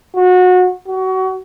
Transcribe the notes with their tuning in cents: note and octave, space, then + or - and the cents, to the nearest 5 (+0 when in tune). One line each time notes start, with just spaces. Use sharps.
F#4 -25
F#4 +25